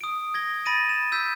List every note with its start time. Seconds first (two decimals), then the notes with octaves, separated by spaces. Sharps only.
0.01 D#6 D7
0.34 G#6 A#6 G7
0.65 B5 A6 A#6 D7 D#7
0.89 A6 E7
1.12 E6 G6 B6